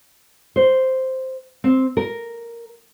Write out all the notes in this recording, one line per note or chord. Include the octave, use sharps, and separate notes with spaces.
C5
C4
A#4